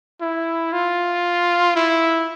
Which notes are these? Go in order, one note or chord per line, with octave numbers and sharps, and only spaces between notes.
E4
F4
E4